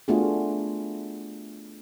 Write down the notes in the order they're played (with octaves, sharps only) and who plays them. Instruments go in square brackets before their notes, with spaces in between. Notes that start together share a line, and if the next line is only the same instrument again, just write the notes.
[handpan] A3 B3 D4 F4 F#4 G#4